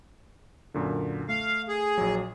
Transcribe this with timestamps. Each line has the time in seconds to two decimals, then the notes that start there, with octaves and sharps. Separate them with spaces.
0.74 F#2 A#2 D3
1.29 A3 F5
1.68 G#4
1.98 A#1 F#3